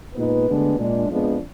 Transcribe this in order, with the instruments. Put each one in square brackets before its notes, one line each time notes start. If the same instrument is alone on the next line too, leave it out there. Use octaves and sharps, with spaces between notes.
[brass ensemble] A#2 G#3 B3 D#4 B4
D2 D3 G#3 B3 D4
A#2 G#3 D4
F2 F3 G#3 B3 D4